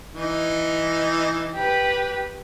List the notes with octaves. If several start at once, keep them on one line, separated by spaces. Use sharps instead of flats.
E3 D#4
G4 B4